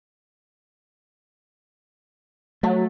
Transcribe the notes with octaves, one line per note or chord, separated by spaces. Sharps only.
F#3 A3